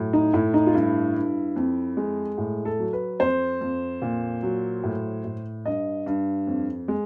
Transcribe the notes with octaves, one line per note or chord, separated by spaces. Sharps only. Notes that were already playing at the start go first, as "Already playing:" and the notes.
Already playing: A2 F#3
D#4
A2 E4
D#4
F4
G2 E4
G2
F2
G#3
A2
A4
F#3
B4
F2 C5
F2
A#2
F#3
A2
A2
G2 D#5
G2
F2
G#3